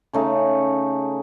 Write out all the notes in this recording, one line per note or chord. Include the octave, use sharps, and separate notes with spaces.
C#3 A3 D#4